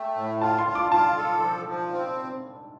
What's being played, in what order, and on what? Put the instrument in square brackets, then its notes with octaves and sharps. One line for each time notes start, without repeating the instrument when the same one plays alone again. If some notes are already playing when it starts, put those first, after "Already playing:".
Already playing: [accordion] A3 [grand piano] G5
[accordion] A2
[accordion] F4 [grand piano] A5
[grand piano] C6
[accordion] F4
[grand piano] D6
[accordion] F4 [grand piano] A5
[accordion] A4
F3
F3
C4